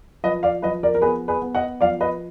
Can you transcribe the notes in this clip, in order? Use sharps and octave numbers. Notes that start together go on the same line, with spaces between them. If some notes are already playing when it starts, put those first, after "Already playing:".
F3 B4 D#5
D5 F5
F3 B4 D#5
A#4 D5
A#4
B3 G#4 B4
G#4 B4
B3
D#5 F#5
F3 D5 F5
B4 D#5